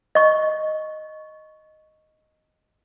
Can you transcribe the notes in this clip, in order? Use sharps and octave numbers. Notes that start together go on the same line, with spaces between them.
D#5 C#6